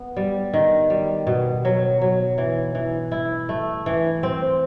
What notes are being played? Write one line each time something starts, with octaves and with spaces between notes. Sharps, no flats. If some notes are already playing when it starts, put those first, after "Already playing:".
Already playing: B3
G3
D#3
G3
B2
F#3
F#3
E3
E3
E4
A3
E3
C4